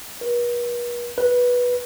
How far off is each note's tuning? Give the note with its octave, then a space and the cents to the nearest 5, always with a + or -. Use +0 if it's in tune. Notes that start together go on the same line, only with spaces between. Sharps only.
B4 -45
B4 -10